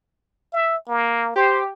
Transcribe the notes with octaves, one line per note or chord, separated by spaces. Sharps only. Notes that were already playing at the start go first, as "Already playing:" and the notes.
E5
A#3
G4 C5